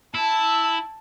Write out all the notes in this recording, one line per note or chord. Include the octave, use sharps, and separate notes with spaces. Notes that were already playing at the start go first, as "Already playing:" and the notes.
E4 A5